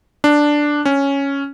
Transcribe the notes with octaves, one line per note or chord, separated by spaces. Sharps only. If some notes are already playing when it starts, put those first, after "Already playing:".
D4
C#4